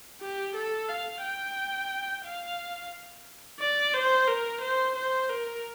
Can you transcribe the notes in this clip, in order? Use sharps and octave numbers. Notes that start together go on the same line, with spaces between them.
G4
A4
F5
G5
F5
D5
C5
A#4
C5
C5
A#4